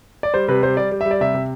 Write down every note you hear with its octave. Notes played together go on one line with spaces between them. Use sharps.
D5
G3 C5
C3 B4
G3 C5
G3 D5
G3
E5
G3
D5
C3 E5
C3